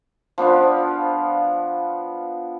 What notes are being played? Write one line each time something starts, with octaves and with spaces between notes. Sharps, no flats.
F3 B3 D4 F5